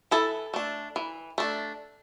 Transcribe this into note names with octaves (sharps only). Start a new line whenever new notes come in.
E3 E4 A4
A3 D4
E3
A3 D4